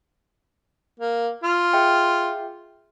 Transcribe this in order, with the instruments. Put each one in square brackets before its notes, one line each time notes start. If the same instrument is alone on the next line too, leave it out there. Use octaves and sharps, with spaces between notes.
[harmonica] A#3
F4
[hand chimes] G#4 E5 G5